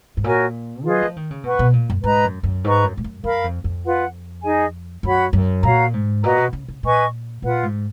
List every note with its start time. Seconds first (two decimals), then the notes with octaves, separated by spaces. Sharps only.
0.17 G#2
0.24 A#2 F#4 A#4 C#5 G#5
0.84 F#3 F4 G#4 B4 D#5
1.02 F3
1.16 D#3
1.31 C#3
1.44 B2 B4 F#5 C#6
1.59 B2
1.73 A#2
1.90 F#2
2.04 G#2 B4 D#5 A#5
2.24 F#2
2.43 F#2
2.64 G#2 B4 D#5 A#5 C#6
2.84 F#2
2.97 G#2
3.04 F#2
3.24 F#2 A#4 F5 B5
3.44 F2
3.64 F2
3.84 F4 B4 F#5
4.43 D#4 G#4 D#5 G#5
5.03 F#2 F#4 C#5 F#5 B5
5.33 F#2
5.63 A#2 F#4 C#5 F5 A#5
5.93 G#2
6.23 A#2 F#4 B4 D#5 A#5
6.38 B2
6.53 C#3
6.68 C#3
6.83 A#2 B4 D#5 G#5 C#6
7.42 A#2 F4 B4 F#5
7.63 G#2